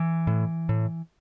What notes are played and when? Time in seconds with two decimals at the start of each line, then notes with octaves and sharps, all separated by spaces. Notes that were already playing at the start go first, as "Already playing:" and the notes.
Already playing: E3
0.27 A2
0.69 A2